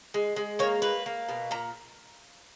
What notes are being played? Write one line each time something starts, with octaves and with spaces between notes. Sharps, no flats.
G#3
G#3
A#3 C#5
A#3 B4
A#3
B2
A#2 A#5